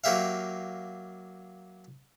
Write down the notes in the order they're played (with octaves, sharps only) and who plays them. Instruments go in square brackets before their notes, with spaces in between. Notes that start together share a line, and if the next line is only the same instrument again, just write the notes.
[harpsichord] F#3 A#3 G4 E5 F5